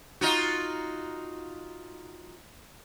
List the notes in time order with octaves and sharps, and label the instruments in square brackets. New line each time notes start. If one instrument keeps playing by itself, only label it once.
[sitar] D#4 F4 F#4